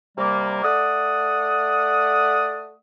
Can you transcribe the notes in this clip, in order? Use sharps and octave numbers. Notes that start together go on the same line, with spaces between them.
C3 G3 A#3
A3 D5 F#5 D#6